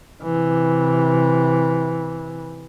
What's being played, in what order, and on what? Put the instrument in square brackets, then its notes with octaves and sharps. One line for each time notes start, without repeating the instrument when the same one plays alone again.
[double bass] C3 E3